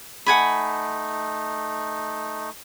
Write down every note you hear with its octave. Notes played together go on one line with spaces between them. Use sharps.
A3 D#4 F#5 G#5 B5